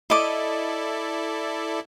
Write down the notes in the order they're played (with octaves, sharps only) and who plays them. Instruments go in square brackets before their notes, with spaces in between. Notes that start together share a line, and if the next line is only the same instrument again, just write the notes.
[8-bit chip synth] E4 A4 D5 [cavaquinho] D#5 D6